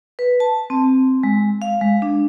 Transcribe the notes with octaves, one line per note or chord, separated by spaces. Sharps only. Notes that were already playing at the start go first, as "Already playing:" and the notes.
B4
A5
C4
G#3
F5
G#3
D4